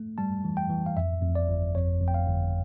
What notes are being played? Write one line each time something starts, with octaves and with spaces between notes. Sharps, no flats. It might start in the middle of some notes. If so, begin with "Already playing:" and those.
Already playing: A3
G3 A5
E3
G5
E3
F5
F2 E5
F2
D5
G1
F2 C#5
F2
G5
F5
G1